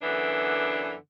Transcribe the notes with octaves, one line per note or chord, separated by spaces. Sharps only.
F#2 D3 E3 B3 D4